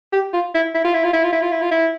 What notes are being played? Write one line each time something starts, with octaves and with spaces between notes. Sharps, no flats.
G4
F4
E4
E4
F4
E4
F4
E4
F4
E4
F4
E4
F4
E4